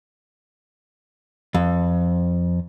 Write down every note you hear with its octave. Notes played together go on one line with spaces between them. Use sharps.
F2